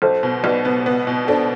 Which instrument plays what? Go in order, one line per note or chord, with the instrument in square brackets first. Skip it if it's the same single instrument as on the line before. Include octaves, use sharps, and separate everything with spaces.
[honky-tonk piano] B1 [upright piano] A4 C5
[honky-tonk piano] B2
[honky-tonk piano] B1 [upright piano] B4 D5
[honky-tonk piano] B3
B3
B2
[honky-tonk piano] D4 [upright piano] A4 C5